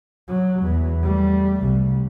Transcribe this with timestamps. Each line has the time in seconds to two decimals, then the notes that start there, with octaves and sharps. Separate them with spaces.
0.28 F#3
0.63 E2
1.03 G3 A3
1.61 C2